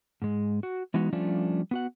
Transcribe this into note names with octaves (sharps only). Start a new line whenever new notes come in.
G#2 G#3
F#4
E3 G#3 B3 D#4 F#4
F3 G3 A3 C#4 D4 F4
B3 F#4 F#5